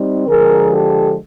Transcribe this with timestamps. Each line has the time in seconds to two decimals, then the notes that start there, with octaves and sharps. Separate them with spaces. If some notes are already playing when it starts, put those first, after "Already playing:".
Already playing: G3 C4 D#4
0.27 D3 F3 G#3 G#4 A#4
0.72 G4 A4